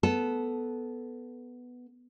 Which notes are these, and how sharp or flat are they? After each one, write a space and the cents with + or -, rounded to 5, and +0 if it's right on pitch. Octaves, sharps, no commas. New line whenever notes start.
B3 +0 A4 -10